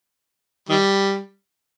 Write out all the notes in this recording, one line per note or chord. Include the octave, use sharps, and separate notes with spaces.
D#3 G3